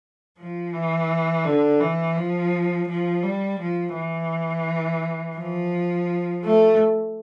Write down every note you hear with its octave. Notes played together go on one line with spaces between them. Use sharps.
F3
E3
D3
E3
F3
F3
G3
F3
E3
F3
A3